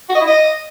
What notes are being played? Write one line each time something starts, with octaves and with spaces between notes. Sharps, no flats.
F#4
D#5
E4
D#5